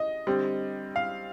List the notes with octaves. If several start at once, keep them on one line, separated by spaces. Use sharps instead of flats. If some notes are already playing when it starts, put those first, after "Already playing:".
Already playing: D#5
D3 G3 C4
F5